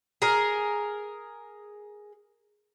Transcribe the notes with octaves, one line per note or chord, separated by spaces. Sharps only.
G#4 A#4